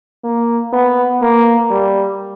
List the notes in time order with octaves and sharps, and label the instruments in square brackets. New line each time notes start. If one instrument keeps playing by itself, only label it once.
[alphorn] A#3
B3
A#3
G3